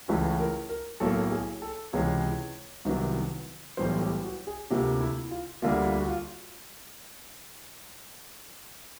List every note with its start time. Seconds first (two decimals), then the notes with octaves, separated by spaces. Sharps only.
0.08 C#2 C#3 E3 A3 C#4 B4
0.40 A#4
0.69 A#4
1.00 B1 A2 F#3 A#3 A4
1.32 G#4
1.62 A4
1.93 C#2 C3 E3 G#3 C#5
2.85 C2 C3 D#3 F#3 B3
3.77 B1 A2 E3 G3 B3 C5
4.01 G4
4.24 F#4
4.47 G#4
4.70 D2 C3 F3 A#3 G4
5.00 E4
5.31 F4
5.62 D2 D3 G3 A#3 F4
5.85 F4
5.99 F#4
6.08 F4